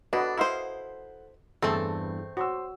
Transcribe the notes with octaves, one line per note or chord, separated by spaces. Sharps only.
D4 F#4 A4 B4 D#5 F#5
E4 C5 D#5 F5 C6
E2 G2 E3 A3 C4 G#4 A4 A5
F#4 C5 C6 E6